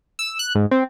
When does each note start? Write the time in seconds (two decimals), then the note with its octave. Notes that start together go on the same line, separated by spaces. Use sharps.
0.19 E6
0.39 F#6
0.55 G#2
0.71 C4